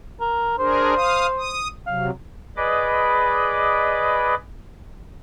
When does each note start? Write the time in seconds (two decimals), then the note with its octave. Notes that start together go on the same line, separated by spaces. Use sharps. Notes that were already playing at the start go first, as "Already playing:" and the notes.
0.20 A#4
0.58 D4 G#4 A#4 C5
0.96 F5 D#6
1.38 D#6
1.87 C3 F#3 F5
2.57 G#4 B4 D5 D#5 B5 D6